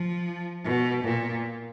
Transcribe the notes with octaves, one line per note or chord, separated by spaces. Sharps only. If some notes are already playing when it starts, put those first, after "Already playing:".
Already playing: F3
B2
A#2